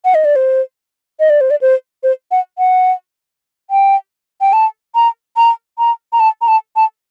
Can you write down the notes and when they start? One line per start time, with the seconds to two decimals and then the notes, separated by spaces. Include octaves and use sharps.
0.05 F#5
0.15 D#5
0.25 D5
0.36 C5
1.20 D#5
1.30 D5
1.41 C5
1.50 D5
1.61 C5
2.03 C5
2.31 F#5
2.58 F#5
3.70 G5
4.41 G5
4.53 A5
4.95 A#5
5.37 A#5
5.79 A#5
6.13 A#5
6.20 A5
6.41 A#5
6.48 A5
6.76 A5